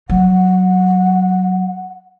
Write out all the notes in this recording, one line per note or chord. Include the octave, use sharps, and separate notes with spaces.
F#3 F#5